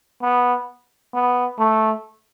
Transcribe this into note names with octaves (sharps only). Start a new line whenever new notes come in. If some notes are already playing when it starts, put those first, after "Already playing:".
B3
B3
A3